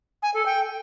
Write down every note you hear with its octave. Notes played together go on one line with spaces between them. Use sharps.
G#5
A4
G5